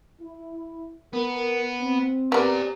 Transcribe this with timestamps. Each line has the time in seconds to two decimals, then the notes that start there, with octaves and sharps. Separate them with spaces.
0.21 E4
1.13 B3 A#4
1.80 C4
2.32 B3 C4 G4 A#4 D5 A#5